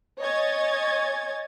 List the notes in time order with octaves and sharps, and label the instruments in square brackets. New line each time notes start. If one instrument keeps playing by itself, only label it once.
[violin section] C#5 D#5 G#5 G#6 A6